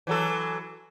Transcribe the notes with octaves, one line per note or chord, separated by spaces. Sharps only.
E3 F#3 A4